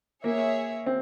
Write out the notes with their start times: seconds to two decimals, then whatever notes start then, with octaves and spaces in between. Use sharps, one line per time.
0.24 A#3 G#4 C#5 E5
0.86 C4